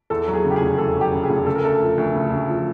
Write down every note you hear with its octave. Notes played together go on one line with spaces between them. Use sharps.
E2 A4
F#3
G#4
C#3
G4
G#4
F1
E2 A4
F#3
G4
C#3
G#4
F1
C#3 A4
A#4
D2 A4
F3
D2
C#3
D2
F3